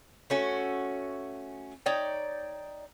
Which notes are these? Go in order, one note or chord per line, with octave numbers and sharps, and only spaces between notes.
A3 C#4 F#4
D#4 C#5 D5 G5